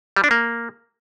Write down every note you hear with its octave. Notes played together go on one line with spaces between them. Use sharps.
G3
D4
A#3